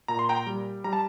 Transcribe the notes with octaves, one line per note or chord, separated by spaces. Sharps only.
A#2 A#5
C6
G5 A#5
G3
G3 A#5
A5